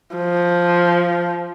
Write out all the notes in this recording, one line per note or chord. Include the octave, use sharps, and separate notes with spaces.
F3